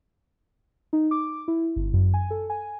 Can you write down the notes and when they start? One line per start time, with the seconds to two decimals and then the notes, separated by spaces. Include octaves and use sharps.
0.93 D#4
1.11 D6
1.48 E4
1.76 G1
1.93 F#2
2.14 G#5
2.31 A4
2.50 G#5